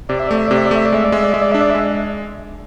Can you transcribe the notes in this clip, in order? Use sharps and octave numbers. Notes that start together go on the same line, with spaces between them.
C3 D5
E5
A3 D5
E5
C3 D5
E5
D5
A3 E5
D5
G#3 E5
D5
G#3 E5
D5
G#3 E5
D5
D4 E5
D5
E5
G#3